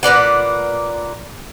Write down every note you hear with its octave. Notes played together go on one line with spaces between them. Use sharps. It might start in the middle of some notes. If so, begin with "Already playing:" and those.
A#2 B4 D5 F#5